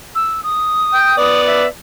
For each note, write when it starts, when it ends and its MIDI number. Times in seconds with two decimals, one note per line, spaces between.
0.15 0.41 88
0.43 1.41 87
0.94 1.17 79
1.17 1.65 59
1.17 1.65 74
1.47 1.68 76